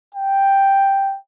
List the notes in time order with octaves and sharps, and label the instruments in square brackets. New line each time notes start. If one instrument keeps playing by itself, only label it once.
[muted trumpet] G5